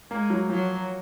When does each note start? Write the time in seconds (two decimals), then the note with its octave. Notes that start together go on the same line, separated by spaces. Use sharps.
0.11 G#3 A#3
0.30 F#3
0.49 F3 F#3